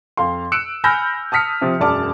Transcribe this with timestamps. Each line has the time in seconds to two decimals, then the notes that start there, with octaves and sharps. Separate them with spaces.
0.17 F2 F5 C6
0.52 E6 F#6 C#7 D7 E7
0.84 G#5 B5 E6 F6 G6 A#6
1.32 A5 D#6 F6 B6 C#7
1.61 C3 F3
1.80 E1 F#2 D5 A5 D6 F6